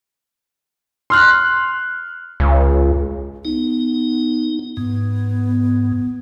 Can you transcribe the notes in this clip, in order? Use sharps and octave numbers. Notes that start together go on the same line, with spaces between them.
C6 F6 F#6
C#2
B3 D#4
G#2 B3